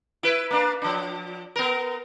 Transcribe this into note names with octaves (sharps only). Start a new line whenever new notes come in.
E4 B4
A#3 D4
F3 D4
B3 A#4